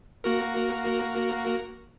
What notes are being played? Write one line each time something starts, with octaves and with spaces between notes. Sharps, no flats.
A#3 F#4 A#4